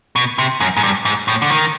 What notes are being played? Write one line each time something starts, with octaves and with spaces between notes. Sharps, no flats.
B2
C3
F#2
G#2
G2
G#2
A2
D3
D#3